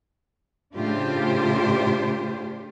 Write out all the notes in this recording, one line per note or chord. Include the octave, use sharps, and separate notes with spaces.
A2 C#3 D4 F4 G4 C5